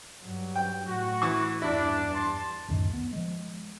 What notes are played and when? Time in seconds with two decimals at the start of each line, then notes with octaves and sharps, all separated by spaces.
0.22 G2 F#3
0.56 G5
0.87 A2 F#4
1.22 E3 C#6
1.62 E2 G2 D4 E4
2.14 A5 C6
2.68 C#2 F#2 A2 D#3
2.94 B3
3.13 F3 G#3